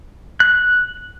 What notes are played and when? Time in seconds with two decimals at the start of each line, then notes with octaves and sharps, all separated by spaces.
0.40 F#6